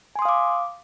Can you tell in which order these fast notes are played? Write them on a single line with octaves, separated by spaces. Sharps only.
G#5 C6 D#6 F5 D6